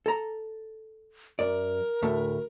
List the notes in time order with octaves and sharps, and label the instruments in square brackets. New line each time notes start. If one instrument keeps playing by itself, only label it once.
[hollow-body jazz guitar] A4 A#5
[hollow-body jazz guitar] F#2 D5 [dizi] A#4
[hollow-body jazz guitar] D2 A2 A3